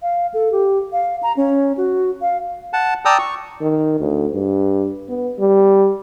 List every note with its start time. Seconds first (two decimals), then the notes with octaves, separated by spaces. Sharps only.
0.02 F5
0.34 A4
0.52 G4
0.92 F5
1.23 A#5
1.37 C#4
1.77 F#4
2.22 F5
2.73 F#5 A5
3.05 D5 G5 A5 A#5 D#6 E6
3.19 C#6
3.61 D#3
4.00 D2
4.34 G2
5.09 B3
5.39 G3